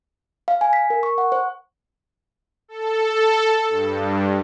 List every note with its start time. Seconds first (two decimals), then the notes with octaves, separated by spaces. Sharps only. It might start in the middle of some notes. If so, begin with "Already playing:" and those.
0.48 F5
0.61 G#5
0.73 B6
0.90 A#4
1.03 C#6
1.18 F#5
1.32 C5
2.68 A4
3.69 G2